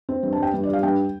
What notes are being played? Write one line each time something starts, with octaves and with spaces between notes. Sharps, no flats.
C4
G2
A5
G3 G5
G2
D5
G3 F5
G2 G5